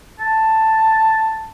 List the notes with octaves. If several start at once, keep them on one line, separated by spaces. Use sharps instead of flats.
A5